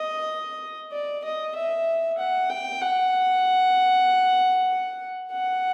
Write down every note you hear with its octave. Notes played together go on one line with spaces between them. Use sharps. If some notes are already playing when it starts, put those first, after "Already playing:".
Already playing: D#5
D5
D#5
E5
F#5
G5
F#5
F#5